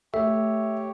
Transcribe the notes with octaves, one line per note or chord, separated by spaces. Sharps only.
A3 G4 C#5 E5